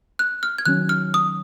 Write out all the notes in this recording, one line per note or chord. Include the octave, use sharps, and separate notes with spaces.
F#6
F6
G#6
D#3 F#3 C#4 F#6
F6
D#6